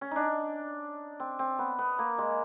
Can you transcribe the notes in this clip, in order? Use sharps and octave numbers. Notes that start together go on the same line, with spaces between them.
C#4
D4 D#4
C4
C4
B3
B3
A#3
G#3